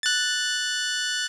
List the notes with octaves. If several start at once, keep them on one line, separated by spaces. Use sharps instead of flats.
F#6 A6